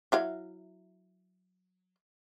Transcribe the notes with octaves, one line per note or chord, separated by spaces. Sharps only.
F#3 E4 F5